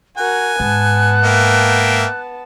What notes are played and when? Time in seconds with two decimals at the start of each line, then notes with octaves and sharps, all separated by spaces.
0.17 F#4 A#4 G#5 F#6
0.60 G#2 B3 A5
1.24 A#3 E5 G5